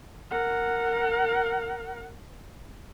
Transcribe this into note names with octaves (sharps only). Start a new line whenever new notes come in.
A#4 F#5